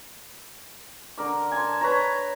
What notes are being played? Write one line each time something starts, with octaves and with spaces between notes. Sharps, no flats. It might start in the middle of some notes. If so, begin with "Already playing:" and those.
D3 A#4 D6
G#5 A5 C6
B4 C#5 A#5